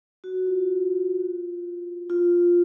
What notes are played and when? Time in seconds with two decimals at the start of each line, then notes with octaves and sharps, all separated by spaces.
0.24 F#4
0.47 F4
2.10 F4